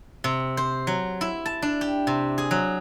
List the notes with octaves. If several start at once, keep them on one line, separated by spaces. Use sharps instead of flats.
C3
C5
F#3
E4
A5
D4
G4
C3
G#4
F#3